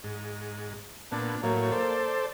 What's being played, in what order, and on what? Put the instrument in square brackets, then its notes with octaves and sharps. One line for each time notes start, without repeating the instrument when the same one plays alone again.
[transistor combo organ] G#2
[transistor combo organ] A#2 B3 [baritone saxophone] D4
[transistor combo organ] A2 F#3 C#5 [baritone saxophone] A#3
[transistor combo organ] A4 C5 D5